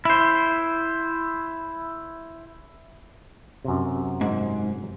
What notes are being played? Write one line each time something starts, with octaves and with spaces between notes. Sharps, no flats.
E4 C5
F#2 C3
G#2